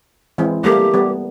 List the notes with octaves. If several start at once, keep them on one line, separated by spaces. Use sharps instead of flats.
E3 G#3 C4
G3 A3 A#3 G4
G3 B3